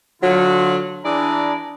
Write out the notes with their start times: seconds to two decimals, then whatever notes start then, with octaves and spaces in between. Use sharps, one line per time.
0.22 D3 F#3 F4
1.04 E3 D4 G#4 D5 A#5 B5